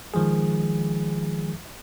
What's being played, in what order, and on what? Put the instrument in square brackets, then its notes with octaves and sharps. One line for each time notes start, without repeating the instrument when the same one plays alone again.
[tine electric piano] D#3 F3 G#3 G#4